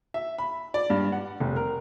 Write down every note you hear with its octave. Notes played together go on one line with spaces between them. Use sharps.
E5
B5
D5
G2
F#5
F1
A#4